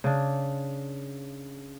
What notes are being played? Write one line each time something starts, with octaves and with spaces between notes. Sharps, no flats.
C#3 D4